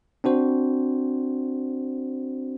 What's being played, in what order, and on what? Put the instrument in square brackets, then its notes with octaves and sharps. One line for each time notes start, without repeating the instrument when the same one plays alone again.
[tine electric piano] C4 D4 F#4 C5